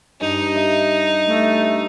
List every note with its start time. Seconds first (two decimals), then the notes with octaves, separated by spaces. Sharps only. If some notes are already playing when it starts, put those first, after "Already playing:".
0.21 G2 D#4
0.56 E5
1.27 A3